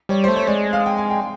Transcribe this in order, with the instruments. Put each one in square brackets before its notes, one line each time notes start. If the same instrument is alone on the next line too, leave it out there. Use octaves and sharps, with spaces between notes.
[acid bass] G3 [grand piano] C#5
[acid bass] A3 [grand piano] C5
[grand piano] C#5
[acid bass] G#3 [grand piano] D5
[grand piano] F5
G5
G#5
G5